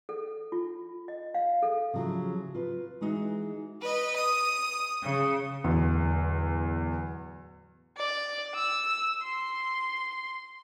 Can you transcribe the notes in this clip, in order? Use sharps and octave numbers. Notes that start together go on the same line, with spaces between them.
A4
F4
D#5
F5
A4
C#3 F3 F#3 E4
F4 B4
E3 G#3 D#4 F#4
B4 D#5
D#6
C#3
D1 E2
D5
E6
C6